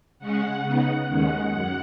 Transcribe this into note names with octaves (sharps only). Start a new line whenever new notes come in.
C#3 G#3 C#4 F#5
C#3 B3 D#4 F#5
D#2 D#3 G#3 C#4 F#5
F#2